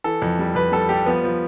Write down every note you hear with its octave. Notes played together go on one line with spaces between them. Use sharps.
E3 A4
F2
G3
F2 B4
G3 A4
G3 G4
F3 B3
F3